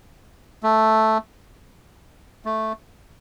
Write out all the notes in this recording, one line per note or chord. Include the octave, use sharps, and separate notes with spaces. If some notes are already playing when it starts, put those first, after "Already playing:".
A3
A3